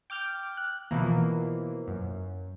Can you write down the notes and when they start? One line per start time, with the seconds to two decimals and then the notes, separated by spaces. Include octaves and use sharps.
0.10 G5 D6 F6 G6
0.57 F#6
0.91 B2 E3 F3 A#3
1.88 F#2